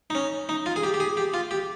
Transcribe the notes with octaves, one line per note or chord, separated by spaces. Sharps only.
D#4
C#4
D#4
F4
G#4
G4
G4
G#4
G4
F4
G4